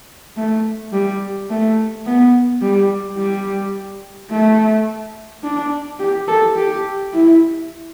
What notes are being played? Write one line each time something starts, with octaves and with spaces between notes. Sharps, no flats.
A3
G3
A3
B3
G3
G3
A3
D4
G4
A4
G4
E4